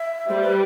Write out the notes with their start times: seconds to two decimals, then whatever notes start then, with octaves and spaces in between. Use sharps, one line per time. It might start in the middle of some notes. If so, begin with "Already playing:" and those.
Already playing: E5
0.29 G3 C5
0.42 B4